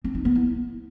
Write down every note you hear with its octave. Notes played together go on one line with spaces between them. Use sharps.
C4
D#4
B3
E4